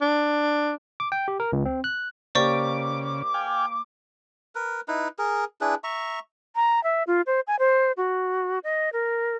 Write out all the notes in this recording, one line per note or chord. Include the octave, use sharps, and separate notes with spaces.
D4
D6
G5
G4
A#4
C#2
C4
F#6
C#3 A#3 G4 C5 D5 C#6 D6
F5 G5 G#5
A#4 B4
D#4 E4 B4
G#4 A#4
D4 E4 G#4 B4
E5 A#5 C#6
A#5
E5
F4
C5
G#5
C5
F#4
D#5
A#4